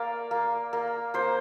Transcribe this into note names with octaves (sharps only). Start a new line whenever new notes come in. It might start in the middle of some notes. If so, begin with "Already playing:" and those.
Already playing: A#3 D5 F5
A#3
A#3
A#3 C5